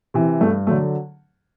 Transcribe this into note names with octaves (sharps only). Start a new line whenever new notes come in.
C3 E3
G2 A3
D3 F#3 A3